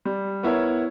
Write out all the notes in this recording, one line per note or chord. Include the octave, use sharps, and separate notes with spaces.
G3
B3 E4 A#4 C#5